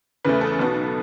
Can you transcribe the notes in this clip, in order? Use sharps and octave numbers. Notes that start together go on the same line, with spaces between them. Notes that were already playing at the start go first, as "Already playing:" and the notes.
E2 C#3 E3 A3 B4
A4
B1 B2 F#3 B3